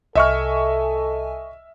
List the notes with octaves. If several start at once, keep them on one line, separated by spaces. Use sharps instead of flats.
C2 A4 D#5 E5 G#5 C#6 F6